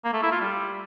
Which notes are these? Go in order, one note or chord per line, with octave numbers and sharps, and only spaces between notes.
A#3
A3
E4
F4
G3